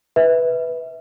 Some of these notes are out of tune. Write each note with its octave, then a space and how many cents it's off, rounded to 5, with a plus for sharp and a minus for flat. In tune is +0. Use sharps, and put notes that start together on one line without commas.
B4 +0 E5 -20